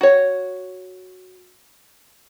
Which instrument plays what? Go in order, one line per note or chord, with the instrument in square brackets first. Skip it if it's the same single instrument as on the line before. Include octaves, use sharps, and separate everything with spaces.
[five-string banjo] F#4 C#5